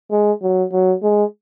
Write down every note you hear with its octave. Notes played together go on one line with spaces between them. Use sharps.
G#3
F#3
F#3
G#3